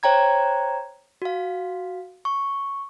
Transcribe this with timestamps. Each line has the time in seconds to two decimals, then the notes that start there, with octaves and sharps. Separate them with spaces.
0.03 C5 C#5 G5 A#5 G#6
1.22 F#4 F5
2.25 C#6